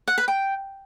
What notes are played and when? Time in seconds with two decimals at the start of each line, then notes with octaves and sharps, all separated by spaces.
0.08 F#5
0.18 B4
0.28 G5